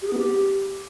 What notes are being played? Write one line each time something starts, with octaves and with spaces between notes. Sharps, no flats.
G4
G#4
B3
G4